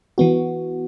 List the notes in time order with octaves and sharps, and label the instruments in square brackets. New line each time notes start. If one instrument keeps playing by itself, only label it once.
[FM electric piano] E3 B3 F#4